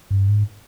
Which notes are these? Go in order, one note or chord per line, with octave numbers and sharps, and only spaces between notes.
G2
G#2